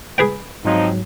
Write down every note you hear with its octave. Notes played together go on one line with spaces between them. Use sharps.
G#4 B4 G5
G#2 F3 F#3 C4 D#4